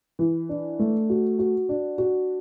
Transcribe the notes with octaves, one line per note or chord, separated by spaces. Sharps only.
E3
D4
A3
F#4
F#4
D4
F#4